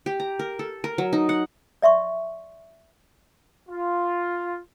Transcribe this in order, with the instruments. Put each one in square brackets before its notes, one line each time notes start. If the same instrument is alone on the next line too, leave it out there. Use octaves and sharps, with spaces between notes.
[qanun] G4
A#5
A#4
A4
A#4
F#3
D#4
F#5
[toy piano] D5 E5 C6 C#6
[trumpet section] F4